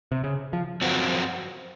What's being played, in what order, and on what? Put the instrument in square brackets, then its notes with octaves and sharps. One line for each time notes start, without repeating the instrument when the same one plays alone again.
[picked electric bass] C3
C#3
F3
[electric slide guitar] F#2 F3 C4 F#4